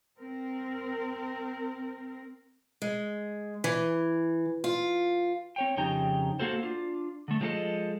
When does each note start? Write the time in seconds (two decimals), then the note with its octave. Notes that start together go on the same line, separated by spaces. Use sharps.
0.17 C4 A#4
2.82 G#3
3.64 E3
4.64 F4
5.56 C4 C#5 G5
5.77 F2 C#3 D#4 G4 G5 A#5
6.39 A#3 F#4 A4 C5
6.63 D4 F4
7.28 D3 A3
7.41 F3 G#3 B3 D4 A4 D#5